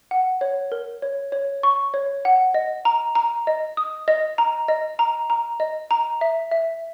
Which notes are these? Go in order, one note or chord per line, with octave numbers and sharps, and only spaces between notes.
F#5
C#5
A#4
C#5
C#5
C#6
C#5
F#5
D#5
A#5
A#5
D#5
D#6
D#5
A#5
D#5
A#5
A#5
D#5
A#5
E5
E5